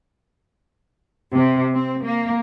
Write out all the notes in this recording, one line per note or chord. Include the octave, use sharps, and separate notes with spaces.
C3
C4
A#3